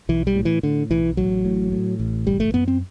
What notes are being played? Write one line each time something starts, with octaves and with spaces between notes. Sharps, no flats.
B1 E3
G3
A2
E3
A2 D3
B1 E3
A1 F#3
A2
A2
A1
F#1 G3
A3
F#2 B3
C4